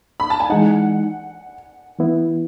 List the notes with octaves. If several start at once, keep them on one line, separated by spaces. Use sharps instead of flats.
B5
A5
G#5
E3 G#3 D#4 F#5
E3 B3 E4